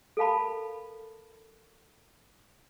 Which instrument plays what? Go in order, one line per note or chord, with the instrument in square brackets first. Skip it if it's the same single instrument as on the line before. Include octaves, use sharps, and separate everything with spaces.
[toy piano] A4 A#4 F5 A5 B5